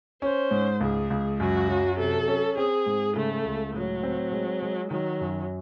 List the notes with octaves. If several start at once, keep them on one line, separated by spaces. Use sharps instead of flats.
C#4 C5
G#2
C#2 G#4
C#2
F#2 F#4
F#3
C3 A4
C#4
C4 G#4
G#2
C#3 A3
C#2
A2 F#3
C4
G#3
G#3
D#3 F#3
F#2